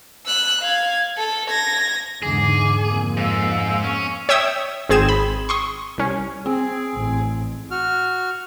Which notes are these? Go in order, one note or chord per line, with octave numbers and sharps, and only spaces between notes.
E6 F#6
F5 G#6
A4
G#6 A#6
E2 G#2 D3 G#4 D6
F2 A#3
G#2 F5 E6
C#4 C#6
C#5 E5 G5 D#6 E6
G#1 C4 G#4 G#6 E7
B5
C6 C#6 D#6
C2 C#4
C4 G#4
A1
F#4 F6